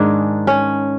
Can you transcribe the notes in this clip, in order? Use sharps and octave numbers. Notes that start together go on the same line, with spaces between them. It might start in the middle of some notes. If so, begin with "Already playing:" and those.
Already playing: G#2 D#3 G#3 D4
C#4